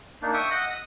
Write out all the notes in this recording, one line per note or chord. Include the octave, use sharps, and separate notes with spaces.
A#3 D4 D#4
E5 G5 C#6 D#6
D#5 F#5
D#6